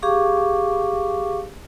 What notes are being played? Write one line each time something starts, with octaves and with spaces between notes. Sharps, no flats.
G4 G#4 F5 C#6 D6